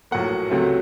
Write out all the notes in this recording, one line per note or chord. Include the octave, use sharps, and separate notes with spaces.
A#1 A2 F#3 A#3 F#5
C#2 C3 F#3 A3